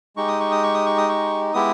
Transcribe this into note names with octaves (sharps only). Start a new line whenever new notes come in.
G#3 D#4 G4 C#6
D#6
C#6
D#6
C#6
D#6
C#6
D#6
C#6
G#3 B3 E4 G4 D#6